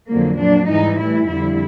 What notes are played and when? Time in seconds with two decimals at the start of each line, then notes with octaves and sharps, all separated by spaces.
0.09 F2 D3 F#3 A#3
0.38 A#2 F#3 D4
0.68 G#2 E3 G3 D#4
0.98 A2 E3 G3 E4
1.28 F2 D3 G3 E4